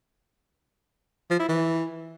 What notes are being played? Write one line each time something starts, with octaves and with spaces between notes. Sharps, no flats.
F3
E4
E3